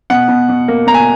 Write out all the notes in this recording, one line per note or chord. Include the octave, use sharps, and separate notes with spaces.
B2 F#5
B2
B2
A#3
B2 A#5
G#5